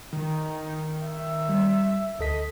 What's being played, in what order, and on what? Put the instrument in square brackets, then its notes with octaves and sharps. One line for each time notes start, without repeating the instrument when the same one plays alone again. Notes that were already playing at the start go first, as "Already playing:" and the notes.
[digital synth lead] D#3 [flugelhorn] D#4
[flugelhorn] E5
[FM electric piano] G3
[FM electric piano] D2 A4 B6 [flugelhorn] D#5